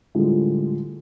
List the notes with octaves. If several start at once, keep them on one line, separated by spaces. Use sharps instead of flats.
A2 D3 F3 G3 G#3